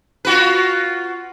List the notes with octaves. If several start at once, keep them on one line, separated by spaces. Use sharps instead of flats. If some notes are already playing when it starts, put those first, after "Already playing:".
F4 F#4 B4